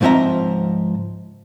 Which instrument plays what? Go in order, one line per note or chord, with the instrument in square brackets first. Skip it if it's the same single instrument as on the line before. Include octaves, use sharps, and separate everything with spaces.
[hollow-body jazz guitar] C#2 G#2 F3 C4 E5 A#5